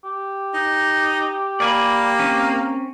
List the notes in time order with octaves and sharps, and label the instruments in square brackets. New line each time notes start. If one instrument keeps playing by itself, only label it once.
[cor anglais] G4
[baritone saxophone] D#4
[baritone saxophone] A#3 [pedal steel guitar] D5 G#5 B5
[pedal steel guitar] C4 C#4